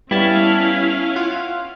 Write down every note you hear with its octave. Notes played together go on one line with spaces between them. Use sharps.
G3 B3 C#4 E4 E5 F5 A5
F4 F#5